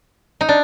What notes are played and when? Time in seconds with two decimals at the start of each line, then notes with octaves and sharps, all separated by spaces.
0.41 D#4
0.49 D4